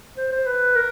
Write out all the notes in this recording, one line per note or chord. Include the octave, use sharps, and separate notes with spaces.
C5
C5
B4
A#4